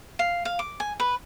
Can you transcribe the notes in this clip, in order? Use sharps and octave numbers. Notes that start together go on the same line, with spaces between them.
F5
F5
D6
G#5
B4